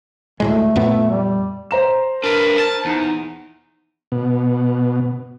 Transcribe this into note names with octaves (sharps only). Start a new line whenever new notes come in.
D2 A2 G#3 A3
F2 A#2 B3
G3
C5 A#5 E7
D4 A#4 B4
A5
E2 D#4
B2